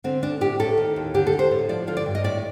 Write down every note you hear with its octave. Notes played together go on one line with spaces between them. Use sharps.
D3 C4
D2 D4
A2 G4
A2 A4
D#3
D#2
D3 G4
A4
D3
C5
A2
F3 D5
D3 F4
D5
G2
D#5
A2 D5